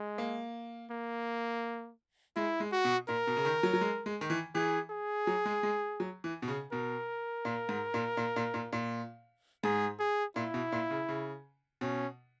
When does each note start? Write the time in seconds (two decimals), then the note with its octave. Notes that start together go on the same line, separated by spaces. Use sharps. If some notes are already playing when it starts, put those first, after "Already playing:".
Already playing: G#3
0.18 A#3
0.91 A#3
2.36 G#3 E4
2.60 G#3
2.72 F#4
2.85 B2
3.09 A#2 A#4
3.27 B2
3.37 C#3
3.45 D#3
3.63 F#3
3.73 F#3
3.81 G#3
4.06 G#3
4.21 D#3
4.30 E3
4.55 E3 G#4
4.90 G#4
5.27 F#3
5.45 G#3
5.63 G#3
6.00 F#3
6.24 E3
6.42 B2
6.48 C#3
6.72 B2 A#4
7.45 A#2
7.69 G#2
7.94 A#2
8.17 A#2
8.36 A#2
8.54 A#2
8.73 A#2
9.64 G#2 G#4
10.00 G#4
10.36 A#2 E4
10.54 B2
10.72 A#2
10.90 C#3
11.09 C#3
11.81 B2 C#4